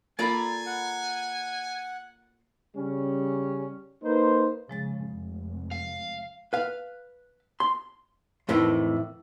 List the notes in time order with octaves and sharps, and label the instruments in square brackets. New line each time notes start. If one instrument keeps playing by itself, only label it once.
[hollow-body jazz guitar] A#3 F4 A4 [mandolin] D5 A#5 B5 [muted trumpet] G#5
[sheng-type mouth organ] F#5
[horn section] C#3 G3 C#4
A#3 D#4 B4 C5
[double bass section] C#3 [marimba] F3 G#3 A6
[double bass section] F1
[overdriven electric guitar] F5
[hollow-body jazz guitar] B4 F5
C6
F2 A2 D#3 E3